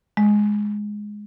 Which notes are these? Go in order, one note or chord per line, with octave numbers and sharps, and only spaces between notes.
G#3